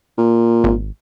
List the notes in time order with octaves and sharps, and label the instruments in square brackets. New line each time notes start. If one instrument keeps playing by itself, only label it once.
[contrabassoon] A#2
[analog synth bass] G#1